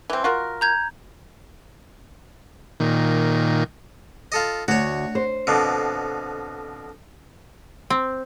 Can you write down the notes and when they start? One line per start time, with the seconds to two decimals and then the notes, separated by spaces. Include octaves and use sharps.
0.10 E3 C4
0.24 F4 F#4 A#4
0.61 A#5 G6 G#6
2.80 A#2 D#3
4.32 F4 A4 D#5
4.68 D2 F#4 C#5
5.15 C5
5.47 F2 B2 D3
7.90 C4